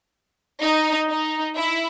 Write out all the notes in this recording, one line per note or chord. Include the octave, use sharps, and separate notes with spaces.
D#4
D#4
E4